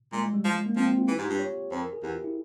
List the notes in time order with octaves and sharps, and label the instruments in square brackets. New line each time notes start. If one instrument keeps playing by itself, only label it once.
[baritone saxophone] A#2 [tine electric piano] G#3
[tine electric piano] G#3
G3
[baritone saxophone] F3 [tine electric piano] G#3
[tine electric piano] G#3
A#3
[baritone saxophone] F3 [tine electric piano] C4
[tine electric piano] C4
F4
[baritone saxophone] E3 [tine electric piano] G#4
[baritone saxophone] G#2 [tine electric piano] G4
[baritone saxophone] G2 [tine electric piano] F4
[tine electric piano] C#5
[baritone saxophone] F2 [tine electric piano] C5
[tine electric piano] A#4
G#4
[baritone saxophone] E2 [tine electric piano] G4
[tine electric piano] F4
E4